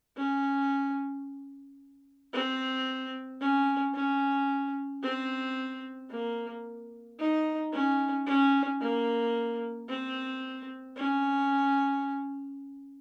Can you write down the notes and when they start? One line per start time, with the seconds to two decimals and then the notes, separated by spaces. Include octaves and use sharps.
0.17 C#4
2.33 C4
3.40 C#4
3.94 C#4
5.03 C4
6.11 A#3
7.19 D#4
7.72 C#4
8.26 C#4
8.81 A#3
9.89 C4
10.96 C#4